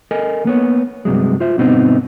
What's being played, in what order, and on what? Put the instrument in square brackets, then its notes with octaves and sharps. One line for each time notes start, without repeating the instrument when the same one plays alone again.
[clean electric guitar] A4 A#4 D#5 G#5
A#3 B3 C#5
G2 C3 F#3 G#3
F4 C5 E5
G2 B2 D3 B3 C4 D#4